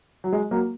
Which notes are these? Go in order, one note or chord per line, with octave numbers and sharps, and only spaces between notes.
F#3
G#3
F#3 A#3